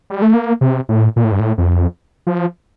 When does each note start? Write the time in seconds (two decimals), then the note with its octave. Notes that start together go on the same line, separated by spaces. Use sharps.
0.10 G3
0.22 A3
0.34 A#3
0.61 C3
0.89 A2
1.16 A#2
1.24 A2
1.32 G2
1.40 A2
1.58 F2
2.27 F3